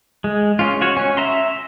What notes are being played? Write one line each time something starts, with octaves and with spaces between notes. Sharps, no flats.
G#3
C#4 F4
F#4 C#5
C#4
E5 A#5 C6